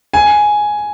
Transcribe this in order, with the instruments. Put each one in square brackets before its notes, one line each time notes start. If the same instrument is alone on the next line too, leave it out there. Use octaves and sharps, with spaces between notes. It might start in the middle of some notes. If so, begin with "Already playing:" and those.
[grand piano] G#5